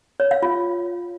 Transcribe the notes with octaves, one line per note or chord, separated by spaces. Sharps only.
C#5
F5
F4